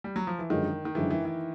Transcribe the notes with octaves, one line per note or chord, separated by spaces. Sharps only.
G3
F#3
F3
E3
F#2 D3 D#3 F3 G#3
D#3
F#2 D3 E3 F3 G#3
E3
E3